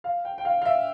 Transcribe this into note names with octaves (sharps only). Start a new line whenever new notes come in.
F5
G5
G5
F5
F5
E5